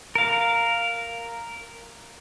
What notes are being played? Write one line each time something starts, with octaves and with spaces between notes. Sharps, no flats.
A#4 F5